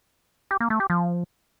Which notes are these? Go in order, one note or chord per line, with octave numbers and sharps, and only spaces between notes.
G4
A#3
A3
G4
F3